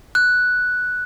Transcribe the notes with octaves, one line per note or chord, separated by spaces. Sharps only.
F#6